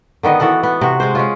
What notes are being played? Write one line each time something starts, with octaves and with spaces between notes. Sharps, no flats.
D3 D#3 B3 D#5
E3 F#4 A4 F#5
B3
C3 F#4
G#3 G#4 C5
G#3 C#4 F4